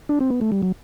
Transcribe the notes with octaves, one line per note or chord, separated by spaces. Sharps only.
D4
C4
B3
A3
G3
F#3